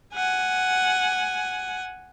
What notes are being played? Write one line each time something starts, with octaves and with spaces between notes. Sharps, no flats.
F#5 G#5